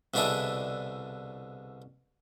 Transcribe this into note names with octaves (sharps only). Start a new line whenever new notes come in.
C2 B2 D3 D4 E4 G#4